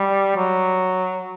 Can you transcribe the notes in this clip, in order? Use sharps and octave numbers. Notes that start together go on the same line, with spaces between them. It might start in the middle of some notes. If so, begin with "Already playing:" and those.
Already playing: G3
F#3